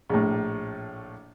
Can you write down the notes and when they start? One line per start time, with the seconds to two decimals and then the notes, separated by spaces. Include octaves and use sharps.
0.09 A#1 A2